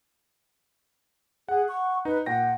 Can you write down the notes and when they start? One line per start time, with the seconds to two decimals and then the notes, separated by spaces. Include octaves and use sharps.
1.49 G#4 F#5
1.68 C#6
2.05 D#4 B4
2.26 A#2 F#5 G5 A#6